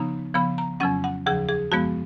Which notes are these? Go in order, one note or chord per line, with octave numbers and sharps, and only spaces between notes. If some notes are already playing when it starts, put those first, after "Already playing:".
Already playing: C#3 F3 B3 D#4 A#5
C#3 F3 B3 B5
A#5
F2 C#3 F#3 C#4 F#5
F#5
D#2 C#3 F3 G#4
G#4
F#2 F3 G#3 B3 F#4